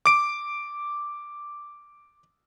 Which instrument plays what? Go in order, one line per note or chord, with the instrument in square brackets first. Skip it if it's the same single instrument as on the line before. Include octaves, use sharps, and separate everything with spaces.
[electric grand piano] D6 D7